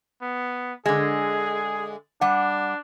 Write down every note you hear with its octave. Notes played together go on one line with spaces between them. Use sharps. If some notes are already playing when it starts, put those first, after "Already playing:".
B3
D3 G#3 G#4
G3 D4 F#5